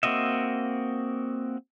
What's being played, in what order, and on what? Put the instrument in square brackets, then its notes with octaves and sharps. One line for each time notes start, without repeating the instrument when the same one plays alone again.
[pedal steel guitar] A#3 C4 F#4 D#5 E5